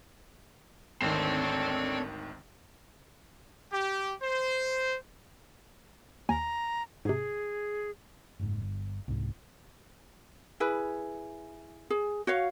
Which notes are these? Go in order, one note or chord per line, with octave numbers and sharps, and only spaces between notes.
G#1 D2 D#3 C4 D4 A4 C#5 G5
G4
C5
D#2 G#5 A#5
G#2 C3 G#4
F#1 G#2
G1
C2 G#2
E4 G#4 B4
G#4
F#4 C#5 F5